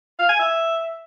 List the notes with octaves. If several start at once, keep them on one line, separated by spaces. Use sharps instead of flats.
F5
G#5
E5